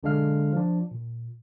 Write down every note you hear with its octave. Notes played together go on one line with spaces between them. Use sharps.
B1 D3 G#3 D4 F5 F6
F3 D4
A#2